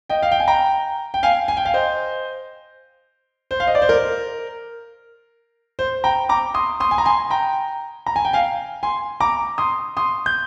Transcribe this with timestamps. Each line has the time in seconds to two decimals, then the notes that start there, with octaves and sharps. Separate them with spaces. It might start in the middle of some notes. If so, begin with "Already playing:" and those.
0.09 D#5 G5
0.22 F5
0.32 G5
0.40 G#5
0.48 G5 A#5
1.14 G5
1.23 F5 G#5
1.48 G#5
1.57 G5
1.65 F5 G#5
1.74 C5 D#5
3.51 C5
3.60 F5
3.67 D#5
3.75 D5
3.82 C5
3.89 A#4
5.79 C5
6.04 G5 A#5
6.29 A#5 D6
6.54 C6 D#6
6.80 C6 D#6
6.91 G#5
6.98 A#5
7.05 G#5 C6
7.30 G5 A#5
8.06 A#5
8.16 G#5
8.25 G5
8.33 F5 G#5
8.83 G#5 C6
9.20 A#5 D6
9.58 C6 D#6
9.97 C6 D#6
10.26 G6